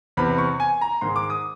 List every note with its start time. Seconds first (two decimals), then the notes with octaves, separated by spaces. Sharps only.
0.17 E2 C3 E3 B5
0.38 C#6
0.60 G#5
0.81 A#5
1.01 G#2 D#3 G#3 C6
1.16 D6
1.30 D#6